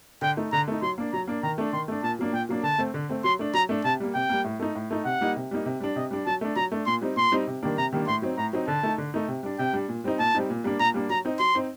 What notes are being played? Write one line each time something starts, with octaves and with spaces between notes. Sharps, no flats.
D3 G5
A3 D#4
D3 A#5
A3 D#4
F#3 C6
A#3 D4
F#3 A#5
A#3 D4
D#3 A#5
A3 D4
D#3 C6
A3 D4
A#2 A5
F#3 A#3 D4
A#2 G5
F#3 A#3 D4
D3 A5
A3 C4
D3
A3 C4
F#3 C6
A3 D4
F#3 A#5
A3 D4
C3 A5
G3 A#3
C3 G5
G3 A#3
A2
A3 D#4
A2
A3 D#4
C3 F#5
G3 A#3 D#4
C3
G3 A#3 D#4
C3
G3 D4
C3 D#5
G3 D4
F#3 A5
A3 D4
F#3 A#5
A3 D4
A#2 C6
G3 C4 D#4
A#2 C6
G3 C4 D#4
C3
D#3 G3 A#3 D4
C3 A#5
D#3 G3 A#3 D4
A2 C6
F#3 C4 D#4
A2 A#5
F#3 C4 D#4
D3 A5
A3 D#4
D3
A3 D#4
C3
G3 D4
C3 G5
G3 D4
A#2
G3 C4 D#4
A#2 A5
G3 C4 D#4
A#2
G3 A#3 D4
A#2 A#5
G3 A#3 D4
F#3 A#5
C4 D#4
F#3 C6
C4 D#4